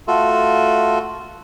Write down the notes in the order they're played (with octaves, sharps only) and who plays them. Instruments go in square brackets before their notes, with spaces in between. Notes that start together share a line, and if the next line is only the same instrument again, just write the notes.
[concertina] A3 F4 F#4 A4